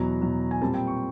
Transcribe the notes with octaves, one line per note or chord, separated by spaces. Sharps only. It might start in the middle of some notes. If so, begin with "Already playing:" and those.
Already playing: E2 B2 F#3 A#5
E2 B2 F#3
G#5
A#2 G3 C4 A5
G5
C#6